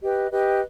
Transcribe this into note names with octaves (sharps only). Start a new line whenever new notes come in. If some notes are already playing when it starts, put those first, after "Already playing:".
G4 B4 D#5
G4 B4 D#5